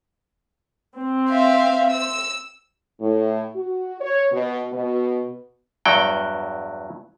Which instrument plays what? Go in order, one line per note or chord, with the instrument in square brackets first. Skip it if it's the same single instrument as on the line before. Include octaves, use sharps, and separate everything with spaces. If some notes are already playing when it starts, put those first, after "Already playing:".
[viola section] C4
[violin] E5 F5
E6
[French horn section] A2
F#4
C#5
B2
B2
[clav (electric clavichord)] E2 G2 F#3 F#5 G5